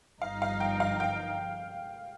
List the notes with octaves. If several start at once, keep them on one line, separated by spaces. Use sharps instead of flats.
G1 G2 F3 D#4 F5
F5
G5
F5
G5